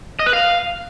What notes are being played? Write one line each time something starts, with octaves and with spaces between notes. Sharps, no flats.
D#5
B4
F5